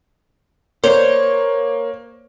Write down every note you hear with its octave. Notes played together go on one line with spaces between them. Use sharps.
A#3 C5 C#5